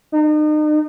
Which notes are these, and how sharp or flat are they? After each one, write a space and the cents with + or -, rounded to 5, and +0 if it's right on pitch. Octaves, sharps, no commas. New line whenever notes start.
D#4 -40